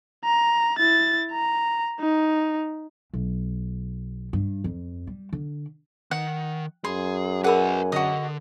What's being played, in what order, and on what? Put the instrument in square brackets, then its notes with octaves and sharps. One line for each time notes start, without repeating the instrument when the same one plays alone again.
[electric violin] A#5
E4 A6
A#5
D#4
[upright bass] B1
G2
F2
G3
D3
[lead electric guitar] D#3 [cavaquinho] F#5
[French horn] F#2 [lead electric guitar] G#4 [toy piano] B5 [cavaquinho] C6
[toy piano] G#4 A#4 B5 [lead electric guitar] B4 C#5 [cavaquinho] F#5 G#5
[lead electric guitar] D3 [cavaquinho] F#4 D#5